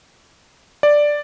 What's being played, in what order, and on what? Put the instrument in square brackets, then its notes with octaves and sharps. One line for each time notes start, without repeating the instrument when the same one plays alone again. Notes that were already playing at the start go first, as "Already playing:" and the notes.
[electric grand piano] D5